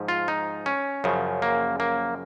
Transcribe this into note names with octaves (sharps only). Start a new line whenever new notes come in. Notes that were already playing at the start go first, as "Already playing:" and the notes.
Already playing: G#2 F3
F4
D#4
C#4
F#2 C#3 F3
A#3
A#3